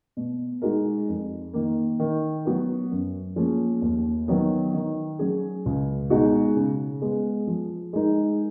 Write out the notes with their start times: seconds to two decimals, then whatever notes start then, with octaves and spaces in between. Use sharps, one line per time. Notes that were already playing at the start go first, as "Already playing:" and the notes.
0.17 B2
0.62 G#3 D#4 F#4 A#4
1.09 F2
1.53 D#3 A#3
1.99 D#3
2.45 F#3 B3 F#4 A#4
2.91 F#2
3.36 F3 A#3 C#4 G#4
3.82 D#2
4.28 D#3 F#3 B3
4.74 D#3
5.19 F#3 C#4 G#4
5.66 C#2
6.10 B2 G#3 D#4 F#4
6.56 C#3
7.02 G#3 B3
7.47 F3
7.93 G#3 D#4 A#4